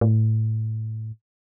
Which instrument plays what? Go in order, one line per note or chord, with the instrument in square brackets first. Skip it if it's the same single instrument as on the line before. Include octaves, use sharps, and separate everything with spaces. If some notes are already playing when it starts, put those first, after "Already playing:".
[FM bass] A2